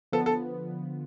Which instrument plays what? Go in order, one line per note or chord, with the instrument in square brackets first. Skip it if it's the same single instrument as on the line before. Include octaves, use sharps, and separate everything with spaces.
[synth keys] D3 F3 B3 [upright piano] A4
[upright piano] A4